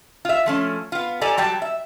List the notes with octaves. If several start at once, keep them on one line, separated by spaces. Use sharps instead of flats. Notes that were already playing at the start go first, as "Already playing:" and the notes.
F4 E5
F3 A3 C#4
B3 F4
G4 A4 D5 G#5 A#5
F#3 G3 G5 A5
E5